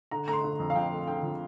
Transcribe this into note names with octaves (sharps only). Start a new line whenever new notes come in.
D3 A#5
A3 A#5
C6
D3
F2
F5
F2 G5
A3
D3 G5
F3